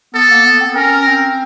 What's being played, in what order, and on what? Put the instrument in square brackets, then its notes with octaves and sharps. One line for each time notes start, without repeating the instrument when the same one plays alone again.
[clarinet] B3 [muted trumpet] A4
[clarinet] A#3
B3
C4
[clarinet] C#4 [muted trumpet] A#4
[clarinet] C4